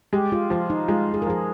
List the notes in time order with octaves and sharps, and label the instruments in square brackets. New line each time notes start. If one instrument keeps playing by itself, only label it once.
[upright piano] G#3 [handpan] G4
[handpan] F4
[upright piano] F3 [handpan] F4
[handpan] D#4
[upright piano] G#3 [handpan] F4
[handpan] G#4
A#4
[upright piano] F3 [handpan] G#4